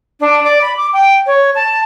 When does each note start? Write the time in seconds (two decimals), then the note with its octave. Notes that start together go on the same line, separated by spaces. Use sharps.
0.20 D4
0.44 D5
0.62 B5
0.77 D6
0.93 G5
1.27 C#5
1.55 A5